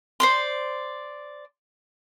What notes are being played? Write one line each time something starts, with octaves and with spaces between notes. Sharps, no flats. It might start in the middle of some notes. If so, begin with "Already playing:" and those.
C5 D5 C6